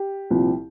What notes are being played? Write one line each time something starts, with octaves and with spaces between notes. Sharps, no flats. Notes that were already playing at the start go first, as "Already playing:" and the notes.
Already playing: G4
C2 A#2 F3